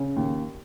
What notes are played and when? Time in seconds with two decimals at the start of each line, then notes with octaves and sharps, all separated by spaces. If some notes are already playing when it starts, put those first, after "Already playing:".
Already playing: C#3
0.16 D#2